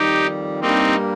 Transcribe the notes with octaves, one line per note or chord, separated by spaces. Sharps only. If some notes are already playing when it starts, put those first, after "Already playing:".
Already playing: F2 D#3 G3 D#4 G4
G2 G3 A#3 C4 D#4